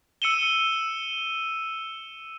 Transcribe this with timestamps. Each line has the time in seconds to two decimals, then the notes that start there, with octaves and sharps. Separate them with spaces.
0.22 E6 C#7 D#7 E7 G7